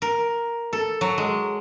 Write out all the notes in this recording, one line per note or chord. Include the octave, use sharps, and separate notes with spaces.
A#4
A4
F#3
G#3